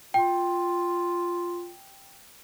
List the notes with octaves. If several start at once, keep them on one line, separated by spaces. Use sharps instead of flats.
F4 G5